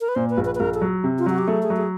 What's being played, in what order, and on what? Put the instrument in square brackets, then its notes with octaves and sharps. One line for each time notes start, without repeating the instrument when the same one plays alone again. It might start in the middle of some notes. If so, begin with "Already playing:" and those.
[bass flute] A#4
B4
[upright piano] A#2 [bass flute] C5
[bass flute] B4
[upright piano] A#1
[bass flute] B4
B4
[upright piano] A#1 [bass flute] A#4
[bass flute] A4
[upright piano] F#3
C3
[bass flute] F4
[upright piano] F#3 [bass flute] F#4
[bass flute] G4
[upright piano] A3 [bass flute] G#4
[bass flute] G#4
[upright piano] F#3
[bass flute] G#4